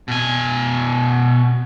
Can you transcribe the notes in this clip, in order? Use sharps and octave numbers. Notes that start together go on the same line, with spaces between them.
B2 G#5